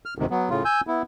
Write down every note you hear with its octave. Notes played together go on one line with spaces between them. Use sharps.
F6
D2 G#2 C3 D#3
F#3 B3
A2 C#3 F4
G#5 E6 G6
B3 E4